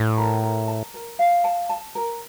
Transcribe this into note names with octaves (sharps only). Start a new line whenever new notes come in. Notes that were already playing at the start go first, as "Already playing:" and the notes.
Already playing: A2
A#4
A#4
A5
A#4
F5
A5
A5
A#4